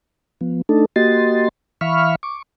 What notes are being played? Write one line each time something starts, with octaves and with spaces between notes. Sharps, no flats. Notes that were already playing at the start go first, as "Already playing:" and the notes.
F3 B3
A3 D4 D#4 A4
A#3 F#4 G4 D#5 C6 A6
E3 E5 F5 B5 C#6 F6
C#6 D6